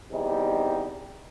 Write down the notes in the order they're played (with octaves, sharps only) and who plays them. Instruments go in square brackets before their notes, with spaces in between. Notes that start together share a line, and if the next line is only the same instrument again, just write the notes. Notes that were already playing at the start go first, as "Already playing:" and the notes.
[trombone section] E2 C3 D#3 G3 D#4